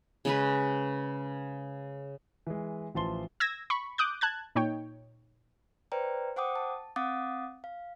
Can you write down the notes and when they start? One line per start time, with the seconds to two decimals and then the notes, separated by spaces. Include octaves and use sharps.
0.25 C#3 G#3 C#4 B4
2.47 E3 G#3
2.95 A1 E3 F3 A5 C6 G7
3.40 E6 G#6 A#6
3.70 B5 C#6
3.98 D6 D#6 F#6 G6
4.21 A5 F#6 G#6
4.55 A#2 D#4 C#5 G5
5.92 B4 C5 D5 G5 A#5
6.36 C5 F#5 G5 D6 D#6
6.56 A5
6.96 C4 F5 F#5 D6 D#6 A6
7.64 F5